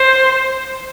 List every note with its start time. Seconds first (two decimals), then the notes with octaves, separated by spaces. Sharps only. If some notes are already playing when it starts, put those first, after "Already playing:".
Already playing: C5